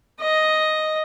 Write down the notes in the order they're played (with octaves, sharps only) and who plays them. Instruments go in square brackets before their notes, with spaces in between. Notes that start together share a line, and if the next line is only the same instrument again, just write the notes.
[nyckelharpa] D#5